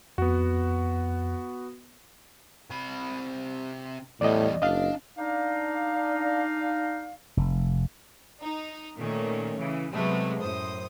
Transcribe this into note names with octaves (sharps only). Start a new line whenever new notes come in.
F2 B3 F#4
C3 B5
E2 A2 G3 D5 D#5
F#1 D4 D#5 F5
D4 D#4 F5
F1
D#4
A#2 D#3 A3 C#4
C#3 E3
C3 F#3 G#3 A3 B3
F#2 A2 C5 D#6